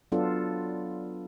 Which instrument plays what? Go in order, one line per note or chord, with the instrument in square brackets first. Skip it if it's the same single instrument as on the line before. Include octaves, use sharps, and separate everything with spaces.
[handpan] F#3 B3 D4 F4 A4